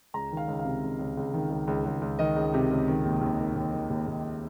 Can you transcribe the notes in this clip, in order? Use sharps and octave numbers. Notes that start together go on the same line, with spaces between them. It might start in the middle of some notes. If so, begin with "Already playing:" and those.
C#2 A#5
D#3
F5
C#2
F5
C3
C#2
C#2
C#2
D#3
C#2
C#2
C#2
C#2
D#3 D#5
C#2
C3
C#2
D#3
D#2
D#2
D#3
D#2
D#3
D#2
D#2
D#2